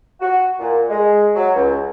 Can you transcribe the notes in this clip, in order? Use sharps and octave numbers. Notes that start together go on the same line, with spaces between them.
F#4
A#2
G#3
F#3
C#2